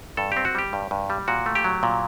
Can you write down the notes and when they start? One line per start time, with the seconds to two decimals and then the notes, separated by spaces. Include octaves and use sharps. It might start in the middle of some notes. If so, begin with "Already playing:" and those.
0.17 G2 A4
0.32 C4 G4
0.45 F#4
0.55 G3 G4
0.73 G2
0.91 G2
1.10 G3
1.28 A#2 F#4
1.46 A3
1.55 G4
1.64 F#3
1.83 A#2